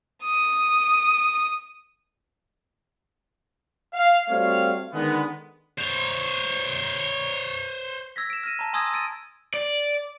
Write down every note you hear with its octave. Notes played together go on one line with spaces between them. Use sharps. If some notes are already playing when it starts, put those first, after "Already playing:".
D#6
F5
G3 A3 C4 F#4 C#5 F5
D3 D#3 G#3 B3
C5 C#5
E6 G#6 A#6 B6
D7 E7
F6 A#6 D#7
A5 A#5
G#5 C6 D#6 E6 G#6 A#6
E6 A6 D7 D#7
D5